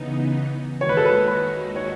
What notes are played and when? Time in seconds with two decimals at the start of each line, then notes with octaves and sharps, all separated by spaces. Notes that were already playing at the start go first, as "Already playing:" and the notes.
Already playing: C#3 E3 B3 D#4
0.81 D#2 D#3 G#3 D#4 F#4 C#5
0.89 B4
0.97 A4
1.05 B4
1.27 B4
1.76 C#5